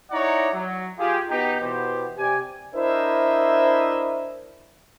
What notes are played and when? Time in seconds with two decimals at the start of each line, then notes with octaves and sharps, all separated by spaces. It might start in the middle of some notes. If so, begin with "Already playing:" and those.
0.11 D#4 E4 C#5 D5 F#5 A#5
0.54 F#3
0.99 F4 G4 G#4
1.30 B2 D#4 G4
1.60 B2 E3 B3 G4 C5
2.17 C3 G4 D5 G#5
2.76 D4 E4 A#4 C5 D#5 E5